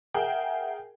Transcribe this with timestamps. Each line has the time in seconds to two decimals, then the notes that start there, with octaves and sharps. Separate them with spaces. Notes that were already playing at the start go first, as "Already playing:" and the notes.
0.14 G#4 A#4 E5 F#5 G5